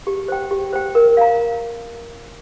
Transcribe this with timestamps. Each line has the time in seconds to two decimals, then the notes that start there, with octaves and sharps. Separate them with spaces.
0.07 G4
0.28 C5 G5
0.51 G4
0.73 C5 G5
0.95 A#4
1.17 F5 A#5